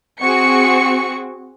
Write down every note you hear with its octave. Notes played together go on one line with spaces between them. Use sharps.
C4 F#4 G#4 C#6 C#7